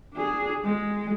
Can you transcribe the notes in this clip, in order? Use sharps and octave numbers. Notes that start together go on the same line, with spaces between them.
D4 G#4
G#3